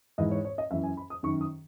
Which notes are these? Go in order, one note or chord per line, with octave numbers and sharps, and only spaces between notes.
G#2 E3 D#5
C#5
C#5
D#5
F#2 E3 E5
G#5
B5
D#6
F#2 D#3 C#6
D#6